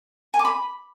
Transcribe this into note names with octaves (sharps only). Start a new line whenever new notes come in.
G#5
D6
B5